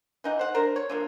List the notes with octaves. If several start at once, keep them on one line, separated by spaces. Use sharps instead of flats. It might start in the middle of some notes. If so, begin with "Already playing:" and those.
E3 D#4 F#5
C5 F#5
D4 A#4 C5 A#5
C#5
D3 F3 A#3